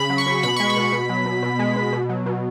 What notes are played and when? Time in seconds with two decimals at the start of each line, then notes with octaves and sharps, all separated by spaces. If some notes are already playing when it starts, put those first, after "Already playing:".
Already playing: C#3 B5
0.10 F#3
0.18 C#6
0.27 C#3
0.43 B2 B5
0.56 G#3 C#6
0.70 B5
0.77 B2
0.92 B2
1.09 F#3
1.26 B2
1.42 B2
1.59 G#3
1.76 B2
1.93 B2
2.09 F#3
2.26 B2